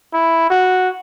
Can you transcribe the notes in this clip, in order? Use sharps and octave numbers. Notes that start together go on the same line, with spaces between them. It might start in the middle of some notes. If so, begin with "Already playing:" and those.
E4
F#4